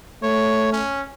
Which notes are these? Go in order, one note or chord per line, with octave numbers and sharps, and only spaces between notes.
A3 C#5
C#4